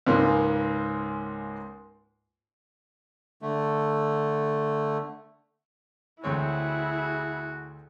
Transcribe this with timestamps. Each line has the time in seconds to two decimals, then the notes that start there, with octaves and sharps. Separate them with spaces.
0.07 C#2 G#2 A#3
3.42 D3 A3
6.24 D2 C4 E4 F#4 G#4 C#5